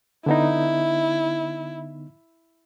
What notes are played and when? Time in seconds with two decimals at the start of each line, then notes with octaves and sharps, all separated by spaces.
0.26 D3 B3 D#4 E4